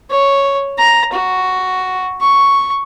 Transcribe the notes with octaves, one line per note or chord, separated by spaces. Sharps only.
C#5
A#5
F#4
C#6